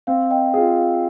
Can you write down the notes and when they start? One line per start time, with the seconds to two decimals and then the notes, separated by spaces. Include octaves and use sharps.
0.07 C4 F5
0.30 D#5 G5
0.54 F4 G#4 F5 G#5
0.77 F5